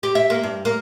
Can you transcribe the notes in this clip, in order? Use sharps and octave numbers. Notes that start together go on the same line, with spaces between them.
G4
E5
A#3
G2
A#3